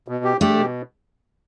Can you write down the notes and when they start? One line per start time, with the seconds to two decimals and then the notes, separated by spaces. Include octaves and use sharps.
0.08 B2
0.24 G4
0.41 A3 D4 G4
0.57 B2